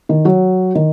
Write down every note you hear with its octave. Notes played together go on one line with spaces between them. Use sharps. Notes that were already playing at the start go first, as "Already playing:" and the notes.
D#3
F#3
D#3